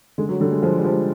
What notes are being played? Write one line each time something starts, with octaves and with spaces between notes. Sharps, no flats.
D3 G#3
F#3
D3 G3
G#3
F3 G#3
G3
F3
G#3